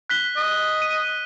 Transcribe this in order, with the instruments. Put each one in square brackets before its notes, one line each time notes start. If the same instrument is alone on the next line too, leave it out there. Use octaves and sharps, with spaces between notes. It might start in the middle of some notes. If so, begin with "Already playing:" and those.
[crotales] F#6 B6 G7
[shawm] D#5
[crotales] D#7